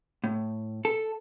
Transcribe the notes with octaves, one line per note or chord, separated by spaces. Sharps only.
A2
A4